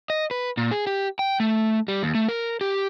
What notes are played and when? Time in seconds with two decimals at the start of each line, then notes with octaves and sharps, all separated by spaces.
0.10 D#5
0.31 B4
0.57 A#2
0.71 G#4
0.87 G4
1.19 G5
1.40 A3
1.88 G3
2.03 D#2
2.15 A3
2.29 A#4
2.61 G4